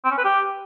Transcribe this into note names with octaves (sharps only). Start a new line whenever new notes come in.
C4
C#4
B4
G4